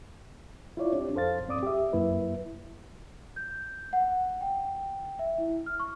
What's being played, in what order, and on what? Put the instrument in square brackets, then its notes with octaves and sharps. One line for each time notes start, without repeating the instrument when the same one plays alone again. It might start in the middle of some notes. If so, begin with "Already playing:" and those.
[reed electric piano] E4 F4 C#5 D5
C4 D4 G4
F2 A4 C5 F5 A6
G2 C4 D5 D6 D#6
G4 E5
F#2 A#3 E4 B4 E5
[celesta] G6
F#5
G5
E5
E4
F6
C#6